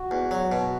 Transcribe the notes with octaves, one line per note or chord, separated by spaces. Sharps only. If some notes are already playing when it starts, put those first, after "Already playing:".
Already playing: F#4
E2
F#3
B2